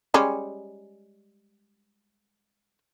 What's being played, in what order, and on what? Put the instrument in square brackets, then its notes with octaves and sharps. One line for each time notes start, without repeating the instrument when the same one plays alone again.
[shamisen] G3 G#3 C#4